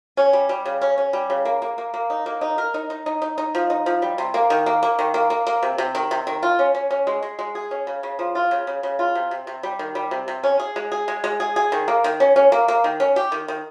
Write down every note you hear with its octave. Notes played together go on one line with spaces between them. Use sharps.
C#4
G3
G3
C#3
C#4
C#4
G3
C#3
A#3
A#3
A#3
A#3
D#4
A#3
D#4
A#4
D#4
D#4
D#4
D#4
D#4
F3
D#4
F3
G3
C3
A#3
D#3
A#3
A#3
D#3
A#3
A#3
A#3
C3
C3
D#3
C3
D#3
F4
C#4
C#4
C#4
G#3
G#3
G#3
G#4
C#4
C#3
C#3
F3
F4
C#3
C#3
C#3
F4
C3
C3
C3
G3
D#3
G3
C3
C3
C#4
G#4
G#3
G#4
G#3
G#3
G#4
G#4
D#3
A#3
D#3
C#4
C#4
A#3
A#3
D#3
C#4
G4
D#3
D#3